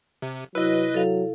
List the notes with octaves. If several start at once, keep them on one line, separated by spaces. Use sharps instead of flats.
C3
C3 F#3 E4 B4 D#5
F#3 A4 F5